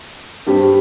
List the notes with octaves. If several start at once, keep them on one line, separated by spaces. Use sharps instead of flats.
G2 G3 C4 G4